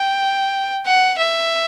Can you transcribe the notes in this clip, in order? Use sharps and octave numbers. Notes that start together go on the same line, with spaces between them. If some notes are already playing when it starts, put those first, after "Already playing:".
Already playing: G5
F#5
E5